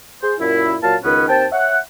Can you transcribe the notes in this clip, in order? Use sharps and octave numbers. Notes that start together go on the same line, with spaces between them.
G#4 C5
F#2 A#2 E4
A#2 F#3 F5 A5
C#2 D#3 B3 C#4 B4
D#2 C4 G5 A5
C#5 E5 F#5